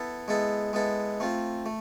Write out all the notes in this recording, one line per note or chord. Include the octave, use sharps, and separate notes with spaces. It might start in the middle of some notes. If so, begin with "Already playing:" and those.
Already playing: B3 E4 A4
G#3 B3 E4 A4
G#3 B3 E4 A4
A3 C4 F4
A3